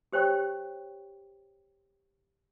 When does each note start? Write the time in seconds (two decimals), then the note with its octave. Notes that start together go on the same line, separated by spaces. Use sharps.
0.13 G4 C5 C#5 G5 C#6